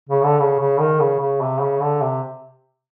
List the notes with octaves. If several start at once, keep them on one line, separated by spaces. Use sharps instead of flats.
C#3
D3
C#3
C#3
D#3
C#3
C#3
C3
C#3
D3
C3